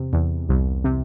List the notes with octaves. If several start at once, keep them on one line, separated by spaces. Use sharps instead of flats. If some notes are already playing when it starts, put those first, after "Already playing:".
Already playing: E2 C3
E2
C2
C3